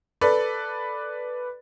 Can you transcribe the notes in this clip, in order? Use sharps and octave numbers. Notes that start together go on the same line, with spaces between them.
A4 B4 D5